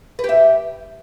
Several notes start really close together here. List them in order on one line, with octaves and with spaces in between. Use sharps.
B4 G4 E5